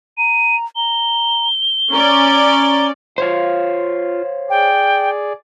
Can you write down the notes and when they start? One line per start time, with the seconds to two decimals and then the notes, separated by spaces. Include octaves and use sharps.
0.18 A#5 D#7
0.76 A#5 G7
1.92 C#4 D5 A#5
3.18 F4 C5 C#5 F5
4.50 G#4 D5 G5